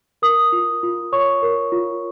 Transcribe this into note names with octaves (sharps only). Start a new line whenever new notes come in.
A#4 D#6
F4
F4
C#5 C#6
A#4
F4